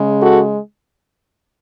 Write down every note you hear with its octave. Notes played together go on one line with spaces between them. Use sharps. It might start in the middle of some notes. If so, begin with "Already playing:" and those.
Already playing: C#3 G#3
F#4 A4